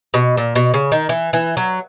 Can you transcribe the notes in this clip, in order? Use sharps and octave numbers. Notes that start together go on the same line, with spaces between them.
B2
A#2
B2
C#3
D#3
E3
E3
F#3